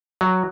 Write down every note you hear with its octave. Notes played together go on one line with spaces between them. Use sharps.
F#3